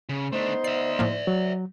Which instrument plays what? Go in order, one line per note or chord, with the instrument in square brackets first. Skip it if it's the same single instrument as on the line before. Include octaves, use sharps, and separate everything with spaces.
[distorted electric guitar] C#3
[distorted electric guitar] A3 D4 [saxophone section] B3 D#4 C5
[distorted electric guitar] D5 E5 [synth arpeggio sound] C7
[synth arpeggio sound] A2 F3 A#3
[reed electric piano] F#3